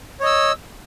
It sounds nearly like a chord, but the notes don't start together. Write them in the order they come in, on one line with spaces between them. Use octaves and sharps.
C#5 D#5 E6